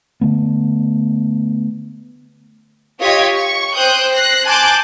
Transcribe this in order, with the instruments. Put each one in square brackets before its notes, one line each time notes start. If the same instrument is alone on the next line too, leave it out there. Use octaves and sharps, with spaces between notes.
[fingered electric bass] D3 A3 B3
[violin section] F4 G4 C#5 D#5 G#6 B6
C#6
C5 G5 D#6 F#6 G6
F#6 A#6 C7
G#5 A5 C6 D6 F#6 G6